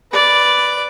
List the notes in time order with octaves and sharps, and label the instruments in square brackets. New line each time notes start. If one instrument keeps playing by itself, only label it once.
[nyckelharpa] B4 D5